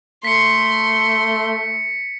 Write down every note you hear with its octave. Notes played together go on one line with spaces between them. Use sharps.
A3 C6 B6 C#7